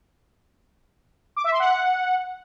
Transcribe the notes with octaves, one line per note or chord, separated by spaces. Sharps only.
D6
E5
C6
F#5